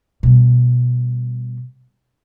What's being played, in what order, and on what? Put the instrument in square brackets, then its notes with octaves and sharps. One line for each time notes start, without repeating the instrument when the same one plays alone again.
[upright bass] B2 G3